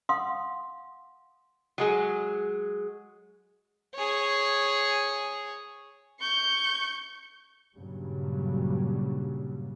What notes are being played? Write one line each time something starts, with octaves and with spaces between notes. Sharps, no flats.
F5 F#5 C6 D#6
F#3 G#3 G#4
G#4 C#5
C#6 G6
G2 A#2 C#3 F#3 G3